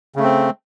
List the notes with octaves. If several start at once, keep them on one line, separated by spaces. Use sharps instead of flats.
C#3 A3 C4